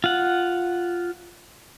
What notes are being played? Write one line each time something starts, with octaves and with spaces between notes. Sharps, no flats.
F4 F#5